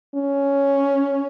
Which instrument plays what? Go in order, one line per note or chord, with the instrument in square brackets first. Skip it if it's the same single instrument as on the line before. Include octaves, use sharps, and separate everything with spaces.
[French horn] C#4